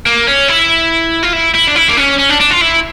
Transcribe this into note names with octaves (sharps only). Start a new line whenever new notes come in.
A#3
C#4
E4
F4
E4
E4
D4
E4
A#3
C#4
C#4
D4
D4
F4
E4